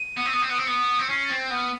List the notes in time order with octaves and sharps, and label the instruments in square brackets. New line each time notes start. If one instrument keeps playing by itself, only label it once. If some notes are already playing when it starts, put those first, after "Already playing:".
Already playing: [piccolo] D#7
[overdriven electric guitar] B3
C4
B3
C4
[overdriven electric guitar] B3 [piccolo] D#7
[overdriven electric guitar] C4 [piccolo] D7
[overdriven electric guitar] B3 [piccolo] C#7
[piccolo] D7
[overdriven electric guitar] C4 [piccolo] C#7
[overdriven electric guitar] C#4 [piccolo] C7
[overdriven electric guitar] C4 [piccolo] A6
[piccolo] G6
[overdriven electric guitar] B3
[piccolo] F6